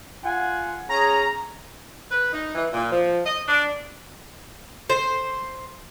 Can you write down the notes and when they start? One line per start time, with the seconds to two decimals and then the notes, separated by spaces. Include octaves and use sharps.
0.24 F4 F#5 G#5
0.89 C#4 G#4 A#5
2.11 B4
2.33 D#4
2.55 E3
2.73 A#2
2.92 F3
3.26 D#5
3.48 D4
4.90 C5